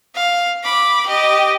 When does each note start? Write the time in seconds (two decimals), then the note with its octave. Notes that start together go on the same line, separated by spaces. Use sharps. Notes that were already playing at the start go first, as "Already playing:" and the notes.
0.15 F5
0.64 B5 D6
1.07 G4 D#5